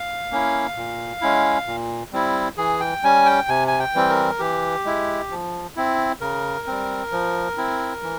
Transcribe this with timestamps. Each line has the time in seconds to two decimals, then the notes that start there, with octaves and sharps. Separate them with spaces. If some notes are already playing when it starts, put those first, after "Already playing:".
Already playing: F5
0.31 A#3 C#4 E4
0.77 A#2
1.21 G#3 C#4 E4
1.67 A#2
2.12 G3 C4 E4
2.57 E3 G#4
2.80 G5
3.04 G3 C#4 G#5
3.26 G5
3.48 C3 G#5
3.68 G#5
3.80 G5
3.95 E3 G3 C4
4.09 A#4
4.39 E3 G4
4.85 G#3 E4
5.31 F3
5.76 C4 E4
6.21 C#3 A#4
6.67 G3 C4
7.12 F3
7.57 C4 E4
8.03 E3